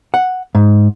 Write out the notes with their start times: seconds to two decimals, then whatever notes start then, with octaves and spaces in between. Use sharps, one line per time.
0.14 F#5
0.55 G#2